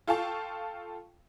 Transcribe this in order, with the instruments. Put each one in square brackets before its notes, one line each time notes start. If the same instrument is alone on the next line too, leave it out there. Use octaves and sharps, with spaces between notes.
[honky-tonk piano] F4 A4 F5 G5 A5 C#6